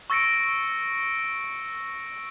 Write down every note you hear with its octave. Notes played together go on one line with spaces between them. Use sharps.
C#6 E6 A6 A#6 C#7 D7